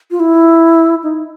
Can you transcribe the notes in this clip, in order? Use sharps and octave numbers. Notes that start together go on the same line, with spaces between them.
F4
E4
D#4